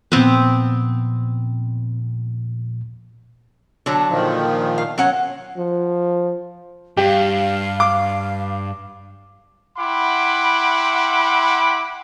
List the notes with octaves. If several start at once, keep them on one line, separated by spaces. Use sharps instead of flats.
A#2 F3 B3 C4
D3 F#3 A4
A#2 D#3 F3
F5
F#3 C#4 F#5
F3
G2 G4 F5
D6
E4 F#5 G5 B5 C6 D6